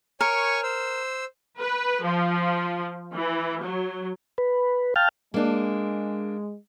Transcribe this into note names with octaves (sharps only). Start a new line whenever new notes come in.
A#4 C#5 G#5 C#6
C5 E6
B4
F3
E3
F#3
B4
F5 G5 A5 F6
G#3 A#3 D4